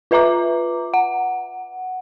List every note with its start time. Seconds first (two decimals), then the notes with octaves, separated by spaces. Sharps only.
0.11 F4 B4 E5 A#5 D6
0.94 F#5